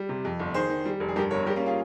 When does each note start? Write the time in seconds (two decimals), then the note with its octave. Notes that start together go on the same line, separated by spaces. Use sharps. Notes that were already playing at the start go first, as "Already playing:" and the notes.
Already playing: G3
0.09 C3
0.25 F2
0.39 G1
0.54 D#3 G#4 C5
0.69 D#3
0.85 G3
1.00 F1
1.08 G#4
1.16 G2 G4 A#4
1.31 G1 A#4 C#5
1.46 G3 G4 A#4
1.56 A#3 C#4
1.66 F4 G#4